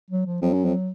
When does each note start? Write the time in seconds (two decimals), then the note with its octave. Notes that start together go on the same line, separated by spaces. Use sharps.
0.10 F#3
0.27 F3
0.42 F2 F#3
0.53 F#2
0.65 F2